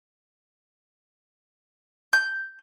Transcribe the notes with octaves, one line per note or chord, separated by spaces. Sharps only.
G6